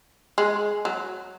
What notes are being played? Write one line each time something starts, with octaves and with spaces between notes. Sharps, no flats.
G#3
F#3